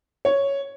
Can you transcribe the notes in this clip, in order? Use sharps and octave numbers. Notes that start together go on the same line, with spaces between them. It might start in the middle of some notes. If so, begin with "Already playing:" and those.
C#5